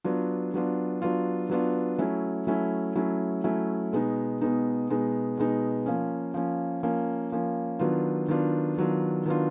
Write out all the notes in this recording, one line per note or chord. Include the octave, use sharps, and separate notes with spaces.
F#3 B3 D4 F4
F#3 B3 D4 F4
F#3 B3 D4 F4
F#3 B3 D4 F4
F#3 A3 C#4 E4
F#3 A3 C#4 E4
F#3 A3 C#4 E4
F#3 A3 C#4 E4
B2 G#3 B3 D#4
B2 G#3 B3 D#4
B2 G#3 B3 D#4
B2 G#3 B3 D#4
F3 A#3 C#4
F3 A#3 C#4
F3 A#3 C#4
F3 A#3 C#4
D#3 F#3 B3 D4 F4
D#3 F#3 B3 D4 F4
D#3 F#3 B3 D4 F4
D#3 F#3 B3 D4 F4